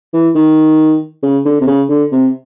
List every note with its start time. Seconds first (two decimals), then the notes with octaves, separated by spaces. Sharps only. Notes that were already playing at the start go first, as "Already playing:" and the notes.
0.13 E3
0.35 D#3
1.23 C#3
1.45 D3
1.61 C3
1.67 C#3
1.89 D3
2.12 C3